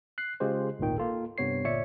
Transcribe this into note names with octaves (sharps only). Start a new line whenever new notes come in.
F#6 C7
C#3 G#3 F4 G4 C5
G#1 D2 A#2 D#3 G5
A#3 F4 A4
G2 C3 B3 C#5 C7
G1 A#2 C#5 D5 E5 C#7